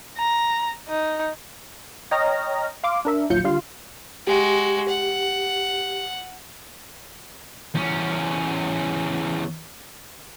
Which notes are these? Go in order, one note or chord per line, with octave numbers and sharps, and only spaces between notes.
A#5
D#4
C#5 D#5 G5 A#5 F6 A#6
F5 C6 D6
D4 A#4 E5
A#1 D#2 F#3 F4 G6 C#7
D3 G3 F4 F5 C6
G#3 F#4 G4
F#5
E2 C#4